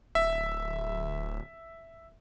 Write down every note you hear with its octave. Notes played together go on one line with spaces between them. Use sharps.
D1 E5